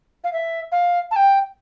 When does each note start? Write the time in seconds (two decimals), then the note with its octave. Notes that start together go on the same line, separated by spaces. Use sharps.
0.24 F5
0.33 E5
0.72 F5
1.11 A5
1.16 G5